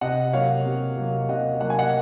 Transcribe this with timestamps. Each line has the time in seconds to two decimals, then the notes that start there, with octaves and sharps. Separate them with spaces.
0.01 C3 D#5 F#5
0.33 F#3 A#3 C#5 F5
0.66 C3
0.97 F#3 A#3
1.29 C3 D#5 F#5
1.61 F#3 A#3 F#5
1.70 G#5
1.79 D#5 F#5